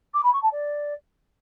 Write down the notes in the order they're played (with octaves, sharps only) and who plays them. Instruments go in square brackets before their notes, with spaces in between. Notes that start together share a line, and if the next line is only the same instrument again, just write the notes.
[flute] D6
B5
C#6
A5
D5